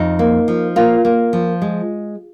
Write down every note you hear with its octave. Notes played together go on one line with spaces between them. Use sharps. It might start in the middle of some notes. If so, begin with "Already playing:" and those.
Already playing: F2 D#4
A#3
F3
A#3 F4
A#3
F3
G#3